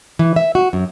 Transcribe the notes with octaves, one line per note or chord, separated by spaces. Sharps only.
E3
E5
F#4
F#2